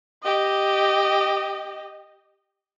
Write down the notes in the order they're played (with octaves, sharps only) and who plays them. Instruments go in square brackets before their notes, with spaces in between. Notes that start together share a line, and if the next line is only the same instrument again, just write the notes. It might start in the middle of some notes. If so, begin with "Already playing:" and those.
[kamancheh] G4 D#5